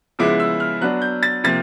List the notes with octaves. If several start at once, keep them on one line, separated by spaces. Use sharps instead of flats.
C#3 F3 G#3 B3 E4 D6
E6
F6
F#3 B3 D4 F#6
G6
A6
C3 F3 A#3 A6